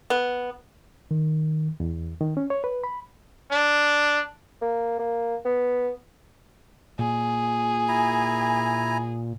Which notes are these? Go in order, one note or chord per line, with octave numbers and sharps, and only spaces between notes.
B3
D#3
E2
D#3
C#4
C#5
B4
B5
D4
A#3
A#3
B3
A#2 G#4
E4 G#5 A#5